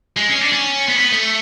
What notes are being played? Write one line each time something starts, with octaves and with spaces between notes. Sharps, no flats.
G#3
C#4
D4
C#4
B3
C#4
B3
A3